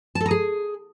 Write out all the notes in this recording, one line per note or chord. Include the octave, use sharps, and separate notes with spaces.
A5
A4
A#5
G#4